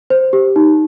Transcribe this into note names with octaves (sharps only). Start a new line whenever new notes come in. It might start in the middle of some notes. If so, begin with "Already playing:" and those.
C5
G4
D#4